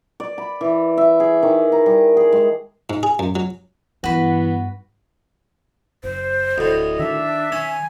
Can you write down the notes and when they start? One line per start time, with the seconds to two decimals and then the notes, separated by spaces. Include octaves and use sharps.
0.20 D5
0.38 B5
0.61 E3
0.98 E5
1.20 G#4
1.43 D#3
1.72 A#5
1.86 G3
2.17 G#4
2.32 G#3
2.90 G#2
3.03 G#4
3.19 F#2
3.35 F#3
4.04 G2 E3 B3 F#4 B4
6.04 F#1 C5
6.58 D1 D2 A2 D#5
6.99 D#3 D4 E5
7.52 C#4 G#5